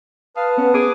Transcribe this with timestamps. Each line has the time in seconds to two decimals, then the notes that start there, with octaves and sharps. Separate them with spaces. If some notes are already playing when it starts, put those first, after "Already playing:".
0.37 B4 F5 A5 D#6
0.57 B3 C#4
0.74 G#4 D6